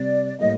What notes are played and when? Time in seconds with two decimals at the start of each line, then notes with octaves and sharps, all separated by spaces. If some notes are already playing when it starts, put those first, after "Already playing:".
Already playing: C3 G3 C4 D5
0.39 A2 G3 A#3 D#5